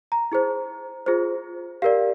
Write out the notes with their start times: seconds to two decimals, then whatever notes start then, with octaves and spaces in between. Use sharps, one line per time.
0.12 A#5
0.32 E4 G#4 C5
1.06 F4 G#4 C5
1.82 G4 A#4 D5 F5